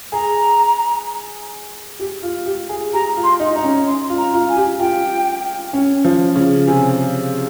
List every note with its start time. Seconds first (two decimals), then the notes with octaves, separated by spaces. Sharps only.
0.12 G#4 A#5
1.99 G4
2.23 F4
2.46 G4
2.69 G#4
2.93 G4 A#5
3.17 F4
3.24 C6
3.40 D#4
3.55 D#4 A#5
3.64 C#4
3.87 C6
4.02 C6
4.09 F4
4.17 A#5
4.34 F4
4.49 G#5
4.56 G4
4.79 F4 G5
5.73 C#4
6.05 F3
6.36 C#3
6.67 C3 G#5